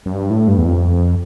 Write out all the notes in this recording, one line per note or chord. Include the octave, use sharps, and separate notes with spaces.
F#2
G2
A2
G2
E2
F2